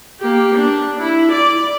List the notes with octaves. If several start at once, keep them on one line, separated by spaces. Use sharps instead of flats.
A#3 G4
D4
E4
D5